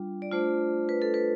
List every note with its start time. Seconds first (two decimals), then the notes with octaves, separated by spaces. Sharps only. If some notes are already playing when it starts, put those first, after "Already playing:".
Already playing: G3 D4 F4
0.22 D5
0.32 A3 D4 F4 C5
0.89 B4
1.02 A4
1.14 B4